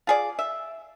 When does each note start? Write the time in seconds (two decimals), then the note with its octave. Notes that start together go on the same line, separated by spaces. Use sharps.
0.07 F4 G#4 D5
0.39 E5